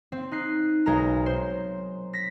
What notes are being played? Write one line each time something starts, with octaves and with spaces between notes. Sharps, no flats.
C4
D#4 F#6 C7
B1 G#3 A#4 A#5
C5
A#6 B6